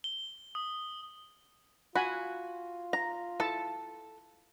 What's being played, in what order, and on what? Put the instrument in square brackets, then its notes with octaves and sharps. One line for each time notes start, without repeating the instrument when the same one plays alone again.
[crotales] G7
D#6
[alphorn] F4 [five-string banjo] F#4 [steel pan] G#5 B5
[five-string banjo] A#5
[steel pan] E4 A5 [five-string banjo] A4